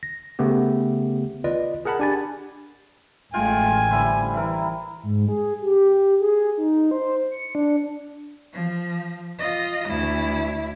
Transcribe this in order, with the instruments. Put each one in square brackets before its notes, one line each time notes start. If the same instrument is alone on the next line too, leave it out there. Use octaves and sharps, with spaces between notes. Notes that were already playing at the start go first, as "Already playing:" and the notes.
[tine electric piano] A#6
C#3 A3 B3 G4
F4 B4 D5 D#5
G#4 A#4 F#5 A5 B5
D4 G4 G#5 B5 A6
[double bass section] A1 [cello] G#3 A3 [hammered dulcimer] F4 G5 [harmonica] G#5
[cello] D3 [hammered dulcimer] G3 E4 C5
[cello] E3 [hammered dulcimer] E4 A#4
[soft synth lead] G#2
G#4
G4
G#4
D#4
C5
C#7
D4
[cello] F3
F4 D#5
D2 E4